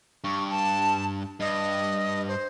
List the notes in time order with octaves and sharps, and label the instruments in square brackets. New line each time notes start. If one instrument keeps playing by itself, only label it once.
[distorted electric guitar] G2 [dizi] C#6
[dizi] A5
[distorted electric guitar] G2 [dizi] D#5
[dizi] C5